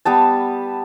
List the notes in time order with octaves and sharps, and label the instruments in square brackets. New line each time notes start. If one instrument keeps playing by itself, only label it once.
[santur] G3 B3 A5